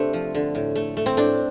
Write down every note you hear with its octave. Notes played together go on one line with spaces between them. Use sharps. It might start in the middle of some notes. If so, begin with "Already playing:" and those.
Already playing: C3 A3 C4 D4
F3
D3
A2
A3
A3
C4
A2 D4